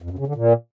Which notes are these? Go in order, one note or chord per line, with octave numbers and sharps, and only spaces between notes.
F2
F#2
C#3
D3
A#2